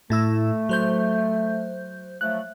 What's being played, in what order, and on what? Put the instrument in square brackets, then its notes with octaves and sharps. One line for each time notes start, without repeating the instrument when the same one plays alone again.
[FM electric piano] A2 E4 E6 [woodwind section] A3
[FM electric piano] F#3 C5 G6
[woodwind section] F3 F#3 A3 [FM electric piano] F#6